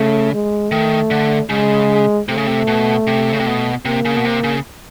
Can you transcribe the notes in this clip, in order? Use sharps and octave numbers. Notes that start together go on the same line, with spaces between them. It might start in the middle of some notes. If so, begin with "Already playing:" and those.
Already playing: C#3 A3
G#3
D#3 A3
D3
C#3 G#3
C3 A3
C#3
C3
B2
C3
C#3
C3
B2
C3 A#3
C#3
B2
C3
C#3